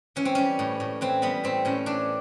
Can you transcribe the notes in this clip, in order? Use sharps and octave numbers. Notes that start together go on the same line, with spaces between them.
E3 C#4
C4
G3 C#4
A2
A2
E3 C4
G3 B3
A2 C4
A2 C#4
E3 D4